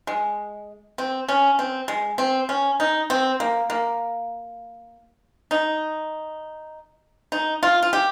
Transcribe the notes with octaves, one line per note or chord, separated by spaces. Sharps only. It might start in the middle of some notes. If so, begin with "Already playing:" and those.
G#3
C4
C#4
C4
G#3
C4
C#4
D#4
C4
A#3
A#3
D#4
D#4
F4
F4
G4